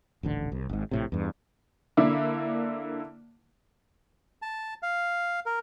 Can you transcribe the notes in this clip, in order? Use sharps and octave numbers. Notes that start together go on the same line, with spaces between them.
D#1 A1 D3
C2
G#1 G#2
A#1 A2 C3
E2 G2
D3 A#3 E4 D6
A5
F5
A#4